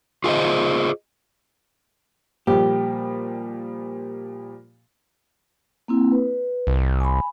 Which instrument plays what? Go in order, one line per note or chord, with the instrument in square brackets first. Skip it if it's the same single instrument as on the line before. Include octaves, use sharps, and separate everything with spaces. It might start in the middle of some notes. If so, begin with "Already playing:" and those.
[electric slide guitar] F4 G#4 A#4 C5 D#5
[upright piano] A#2 F3 G3 [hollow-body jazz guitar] G4
[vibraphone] A#3 C4 E4
B4
[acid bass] C2
[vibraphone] G#5 B5